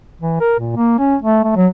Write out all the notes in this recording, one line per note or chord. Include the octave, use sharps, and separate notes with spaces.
E3
A#4
A#2
A#3
C#4
A3
A3
F#3